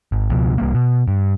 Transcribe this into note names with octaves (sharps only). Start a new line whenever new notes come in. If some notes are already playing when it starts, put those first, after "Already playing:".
G#1
C#2 B2 F3
C2 G3 A#3
B2
G2